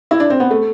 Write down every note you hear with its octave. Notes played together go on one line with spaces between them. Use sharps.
E4
D4
C4
B3
A3